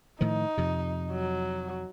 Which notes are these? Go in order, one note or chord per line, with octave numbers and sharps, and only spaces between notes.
A2 D#3 F3 D#4
F2 C3
F#3